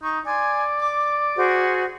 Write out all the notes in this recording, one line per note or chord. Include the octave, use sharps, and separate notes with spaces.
D#4 C#6
D5 G#5 C6
D6
F#4 G#4 C5